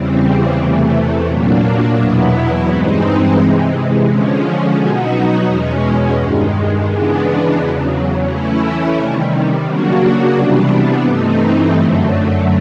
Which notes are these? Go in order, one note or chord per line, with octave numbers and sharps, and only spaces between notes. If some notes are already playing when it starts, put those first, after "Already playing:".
Already playing: E2 C#3 E3 G3 C4
E2 C3 E3 A3
A#2 F#3 A#3 D4
E2 B2 F#3 B3 E4
G2 E3 G#3 C4 D#4
C3 E3 G#3
D3 F3 G#3 C#4
B2 F#3 B3 D#4 F#4
E2 B2 G#3 C#4
G2 D#3 G#3
C#3 E3 G#3 B3 D4
E2 C#3 F#3
E3 A3 C#4 E4
C3 D#3 G3
C#3 F#3 A#3 D4 F#4
C3 E3 G3 B3 D4
G2 E3 A3 C4 D#4
F#2 D3 F#3 A3